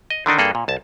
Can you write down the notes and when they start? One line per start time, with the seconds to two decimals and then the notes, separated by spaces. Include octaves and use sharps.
0.10 D#5
0.26 D3 D#3 D4 D#4
0.38 G2 A#3 G#4 A4
0.55 A#2
0.68 C2 A5